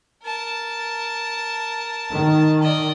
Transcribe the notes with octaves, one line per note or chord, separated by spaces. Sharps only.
A#4 A5
D#3
D5 D#5